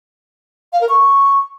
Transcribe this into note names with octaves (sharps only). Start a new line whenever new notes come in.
F5
A#4
C#6